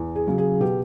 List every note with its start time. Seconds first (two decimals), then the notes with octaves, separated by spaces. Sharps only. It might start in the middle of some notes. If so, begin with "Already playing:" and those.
Already playing: E2
0.15 G#4
0.27 C#3 F#3
0.38 G#4
0.60 B2 G4